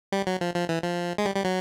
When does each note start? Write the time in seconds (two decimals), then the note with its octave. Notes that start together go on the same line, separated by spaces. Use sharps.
0.12 G3
0.27 F#3
0.41 F3
0.55 F3
0.69 E3
0.83 F3
1.18 G#3
1.25 G3
1.36 G3
1.45 F#3